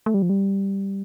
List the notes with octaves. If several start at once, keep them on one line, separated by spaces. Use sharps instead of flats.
A3
G3
F3
G3